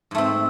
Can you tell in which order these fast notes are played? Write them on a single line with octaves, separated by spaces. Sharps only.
G#2 A3 C4